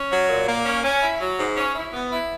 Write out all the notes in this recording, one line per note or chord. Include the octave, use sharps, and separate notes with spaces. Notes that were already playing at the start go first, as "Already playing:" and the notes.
Already playing: C#4
F#3
A#2
A#3
C#4
C#4
E4
F#3
G#2
C#4
E4
B3
E4